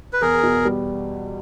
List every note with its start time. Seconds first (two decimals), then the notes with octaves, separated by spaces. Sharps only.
0.13 B4
0.21 E2 G#4 A#4
0.43 B2
0.65 G3